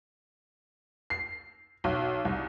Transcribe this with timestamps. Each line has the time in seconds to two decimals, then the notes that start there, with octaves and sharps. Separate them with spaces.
1.10 C7
1.84 B1
2.25 C2